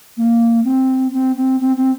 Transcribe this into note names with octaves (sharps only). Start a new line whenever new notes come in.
A#3
C4
C4
C4
C4
C4